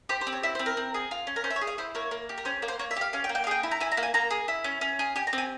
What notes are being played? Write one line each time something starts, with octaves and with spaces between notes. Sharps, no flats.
G4 C5
C5
C4
C#5
E4 E5
C5
C4
A#4
C4
G#4
F4
C#4
A#4
C#4 C5
E5
C#5
G#4
F5
E4 C5
A#3 C#5
A#3
G4
A#4
C#4 C5
A#3
C5
A#3 C#5
E5
G4 F5
C#4 F5
G5
A#3
G5
F5
G#4 G5
E4
A#5
E4 G#5
A#5
A#3
G#5
A#3 A#5
G#4
E4
C#4
C#4
G#4
G4 G#5
A#5
C4
G#5